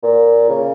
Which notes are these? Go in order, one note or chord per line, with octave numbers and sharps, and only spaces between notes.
A#2
C#3